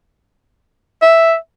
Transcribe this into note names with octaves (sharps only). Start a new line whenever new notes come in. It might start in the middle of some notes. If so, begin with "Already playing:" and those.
E5